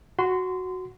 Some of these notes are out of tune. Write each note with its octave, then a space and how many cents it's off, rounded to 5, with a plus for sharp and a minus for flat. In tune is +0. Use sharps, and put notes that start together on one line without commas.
F#4 +0 C6 -25